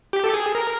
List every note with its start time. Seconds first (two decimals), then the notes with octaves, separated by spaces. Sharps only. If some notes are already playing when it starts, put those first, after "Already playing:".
0.13 G4
0.24 A4
0.34 G#4
0.55 A#4